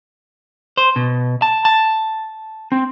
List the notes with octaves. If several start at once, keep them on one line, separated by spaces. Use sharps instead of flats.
C5
B2
A5
A5
C4